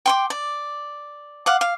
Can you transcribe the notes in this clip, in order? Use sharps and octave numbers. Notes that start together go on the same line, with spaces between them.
G5 C6 D6
D5
F5 F#5 D6
F5